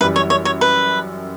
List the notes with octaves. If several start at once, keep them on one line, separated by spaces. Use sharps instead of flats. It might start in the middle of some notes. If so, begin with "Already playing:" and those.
F#2 E3 G3 B4
C#5
C#5
C#5
B4